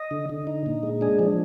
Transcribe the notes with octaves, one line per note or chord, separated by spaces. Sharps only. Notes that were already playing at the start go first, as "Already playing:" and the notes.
Already playing: D#5
D3
D3
D#4
A#2
G#3
D4 G#4
F3